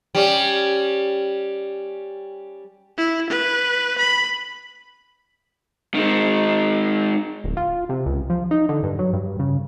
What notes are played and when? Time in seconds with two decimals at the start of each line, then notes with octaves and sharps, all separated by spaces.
0.15 G3 C#4
2.98 E4
3.29 B4
3.98 B5
5.94 D#3 G#3
7.44 D1
7.57 F4
7.89 C3
8.06 C#2
8.30 F3
8.51 D#4
8.69 D3
8.83 G2
8.99 F#3
9.13 G2
9.39 C#3